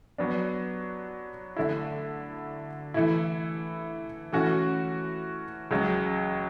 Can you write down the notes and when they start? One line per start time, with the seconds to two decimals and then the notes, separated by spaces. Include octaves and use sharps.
0.18 F#3 B3 D4
1.57 D3 A3 E4
2.94 E3 A3 E4
4.32 E3 A3 C#4 F#4
5.71 C#2 C#3 F#3